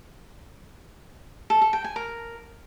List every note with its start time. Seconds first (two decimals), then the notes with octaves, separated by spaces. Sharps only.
1.50 A4
1.61 A4
1.73 G5
1.84 G#5
1.96 A#4